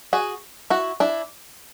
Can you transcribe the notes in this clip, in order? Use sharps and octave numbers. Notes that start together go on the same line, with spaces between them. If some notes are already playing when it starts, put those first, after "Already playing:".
F#4 G#4
E4 F#4
D4 E4